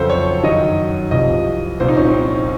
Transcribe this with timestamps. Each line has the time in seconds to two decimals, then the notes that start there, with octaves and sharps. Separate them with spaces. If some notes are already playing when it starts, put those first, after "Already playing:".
Already playing: F2 C#3 F#3 A4 C5
0.10 C#5
0.43 F#2 D#3 F#3 D#5
1.11 C2 C3 F3 D#5
1.80 C2 A#2 F3 C5
1.88 D#4
1.97 C#4
2.05 C4
2.14 D#4